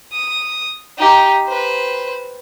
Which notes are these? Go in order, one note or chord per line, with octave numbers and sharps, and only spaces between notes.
D#6
D#4 G4
B4 C5